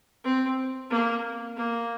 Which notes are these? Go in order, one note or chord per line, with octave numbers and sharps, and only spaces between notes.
C4
A#3
A#3